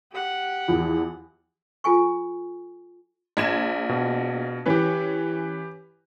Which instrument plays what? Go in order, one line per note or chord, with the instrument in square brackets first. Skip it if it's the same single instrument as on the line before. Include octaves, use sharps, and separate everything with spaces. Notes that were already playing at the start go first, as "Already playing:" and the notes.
[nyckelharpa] G4 F#5
[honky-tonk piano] E2 F3
[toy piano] F4 A4 G#5 C#6
[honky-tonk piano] A#1 G#6 E7
[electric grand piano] B2
[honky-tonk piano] E3 C#4 [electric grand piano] G4 B4